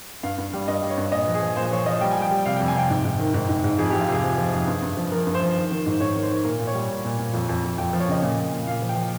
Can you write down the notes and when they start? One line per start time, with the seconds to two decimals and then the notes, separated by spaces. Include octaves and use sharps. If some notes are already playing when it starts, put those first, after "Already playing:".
0.23 G2 F5
0.38 G2
0.53 G3
0.68 G2 D#5
0.82 G3
0.90 C#5
0.98 G2
1.12 A#2 D#5
1.27 F3
1.35 G#4
1.42 F3
1.56 A#2 C5
1.71 F3 C#5
1.86 F3 D#5
2.01 G3 G5
2.11 G3 G#5
2.22 G5
2.31 G3
2.46 C3 F5
2.56 F2 G5
2.68 G#5
2.75 C3 G5
2.90 G#2
3.05 G#2
3.19 D#3
3.34 G#2
3.49 G#2
3.64 G#2
3.78 F2 G#4
3.90 F2 G4
4.01 F4
4.08 C3 G#4
4.23 F3
4.38 F3
4.52 F2
4.67 G2
4.82 G2
4.97 F3
5.12 F3 A#4
5.27 G2
5.35 C5
5.42 F3
5.57 D#3
5.71 D#3
5.86 G#2
6.00 G#2 C#5
6.16 D#3
6.23 C5
6.30 D#3
6.45 A#2 A#4
6.59 A#2
6.67 C#5
6.74 G3
6.89 A#2
7.05 A#2
7.19 A#2
7.34 F2
7.49 F2
7.64 F2
7.78 F2 G5
7.93 F3
8.00 C#5
8.08 C#3 D#5
8.22 A#2
8.37 A#2
8.52 A#2
8.67 A#2 F5
8.82 F3
8.89 G5
8.96 F3